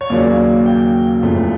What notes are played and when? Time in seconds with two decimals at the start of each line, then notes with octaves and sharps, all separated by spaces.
0.01 C#5
0.10 D#2 C#3 F#3 A#3 D5
0.66 G5
1.22 F#1 E2 C#3 F3 A3